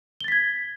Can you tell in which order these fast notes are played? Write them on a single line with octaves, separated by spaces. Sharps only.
G7 A6 B6 G#6